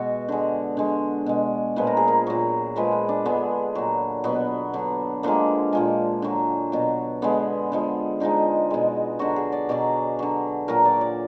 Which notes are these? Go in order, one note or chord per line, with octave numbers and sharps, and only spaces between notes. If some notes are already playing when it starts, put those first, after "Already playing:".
Already playing: B2 G#3 F#4
D3 G#3
D3 G#3
B2 G#3
A#2 F3 G#3 B4
A#4
G#4
A#4
A#2 F#3
A#2 F3 G#3 B4
B4
D4
D3 G#3 B3
A#2 F#3
B2 F#3 B3
D3 F#3
D3 F3 G#3 A#3
A#2 F3 G#3
D3 F#3
B2 F#3
D3 G#3 B3
D3 F3 G#3
D3 F3 G#3 D#4
B2 G#3
D3 F#3 F#4
G#4
D5
B2 F#3 D5
D3 F#3
A#2 F#3 A#4
D5
D5